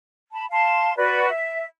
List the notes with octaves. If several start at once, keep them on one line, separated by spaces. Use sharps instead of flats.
A5 B5
F5 A5 C6
F#4 B4 D5
E5